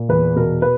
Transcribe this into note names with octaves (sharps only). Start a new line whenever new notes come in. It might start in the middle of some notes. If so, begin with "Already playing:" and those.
Already playing: A#2
E2 B4
B2 A#4
B4